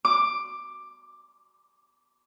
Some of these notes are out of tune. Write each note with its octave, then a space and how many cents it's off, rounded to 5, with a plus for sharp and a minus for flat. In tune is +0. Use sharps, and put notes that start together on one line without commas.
D6 +10